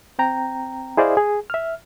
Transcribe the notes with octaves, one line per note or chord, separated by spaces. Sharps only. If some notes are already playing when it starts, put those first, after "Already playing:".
C4 G5 A#5
E4 G#4 C5 D5 D#5 F5
G#4
E5 F6